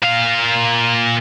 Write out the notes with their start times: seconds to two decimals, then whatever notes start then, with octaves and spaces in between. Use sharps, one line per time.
0.03 A#2 F5